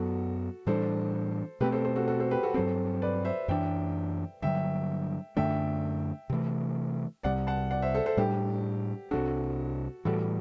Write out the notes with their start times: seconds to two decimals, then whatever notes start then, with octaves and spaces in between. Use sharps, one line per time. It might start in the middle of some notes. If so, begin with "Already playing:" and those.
Already playing: F#2 F#3 B3 F#4 A4
0.67 A2 E3 G3 D4 A4 C5
1.60 B2 A3 C4 G4 B4
1.72 A4 C5
1.84 A4 C5
1.96 F#4 A4
2.08 F#4 A4
2.20 A4 C5
2.31 G4 B4
2.43 F#4 A4
2.54 G2 F#3 C4 A4 C5
3.02 B4 D5
3.25 C5 E5
3.48 F#2 E3 B3 D4 E5 G5
4.42 G2 D3 F#3 E5 G5
5.37 F#2 D3 A3 D4 E5 G5
6.30 C3 E3 A3
7.23 C2 C3 G3 D5 F#5
7.47 F#5 A5
7.71 D5 F#5
7.82 C5 E5
7.94 A4 C5
8.06 A4 C5
8.17 A2 G3 D4 G4
9.11 C2 C3 G3 D4 F#4 A4
10.05 A2 E3 G3 F#4 A4